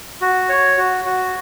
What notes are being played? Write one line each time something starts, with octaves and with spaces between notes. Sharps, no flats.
F#4
C#5
F#4
F#4